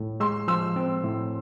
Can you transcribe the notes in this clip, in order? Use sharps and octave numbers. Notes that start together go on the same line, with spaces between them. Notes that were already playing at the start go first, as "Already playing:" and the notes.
Already playing: A2
G#3 C6 E6
F3 C6 E6
C4
A2